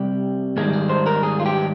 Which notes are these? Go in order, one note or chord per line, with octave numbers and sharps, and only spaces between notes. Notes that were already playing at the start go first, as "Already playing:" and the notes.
Already playing: C2 C3 G3 G4
G#2 D#3 G3 G#4
G#4
C5
A#4
G#4
F4
G4